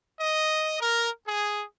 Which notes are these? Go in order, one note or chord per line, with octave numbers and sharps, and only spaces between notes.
D#5
A#4
G#4